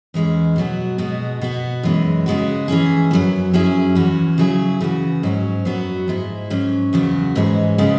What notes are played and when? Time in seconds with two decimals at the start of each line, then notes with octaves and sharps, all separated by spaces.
0.14 E2 E3 G#3 C#4
0.56 B2 F#3 B3 F#4
0.98 B2 G#3 B3 F#4
1.41 B2 B3 F#4
1.83 F#2 E3 G#3
2.26 C#3 G#3 B3 F#4
2.68 E3 C#4 E4 G#4
3.11 F#2 F#3 B3
3.53 F#2 F#3 C#4 E4 G#4
3.95 E2 E3 C#4 F#4
4.38 C#3 F#3 E4 G#4
4.81 C#3 E3 B3 F#4
5.23 G#2 F#3 C#4 F#4
5.65 F#2 F#3 B3 F#4
6.08 G#2 G#3 E4
6.50 G#2 F#3 C#4
6.93 E2 C#3 F#3 B3 F#4
7.35 G#2 E3 G#3 C#4
7.78 C#3 G#3 B3